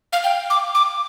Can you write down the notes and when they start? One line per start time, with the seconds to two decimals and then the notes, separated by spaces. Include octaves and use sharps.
0.13 F5
0.24 G5
0.50 D6
0.75 D6